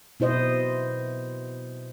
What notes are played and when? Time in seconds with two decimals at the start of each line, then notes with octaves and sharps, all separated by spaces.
0.20 B2 E4 C5 D#5